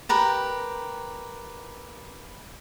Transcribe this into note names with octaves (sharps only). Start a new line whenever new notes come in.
G4 A#4 B4